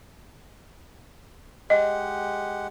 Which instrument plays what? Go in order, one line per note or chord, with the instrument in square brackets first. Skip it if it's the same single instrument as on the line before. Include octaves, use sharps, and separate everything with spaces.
[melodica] G#3 G4 F#5 [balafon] D#5